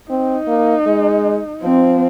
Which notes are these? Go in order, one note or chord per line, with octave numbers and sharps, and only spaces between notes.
C4 D#4
A#3
G#3
F3 C4